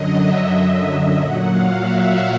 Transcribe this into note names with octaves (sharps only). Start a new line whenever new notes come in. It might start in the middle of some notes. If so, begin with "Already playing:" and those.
Already playing: F#2 D3 F#3 D#5
E5
D#5
E5
A#2 F#3 F#5
F5
E5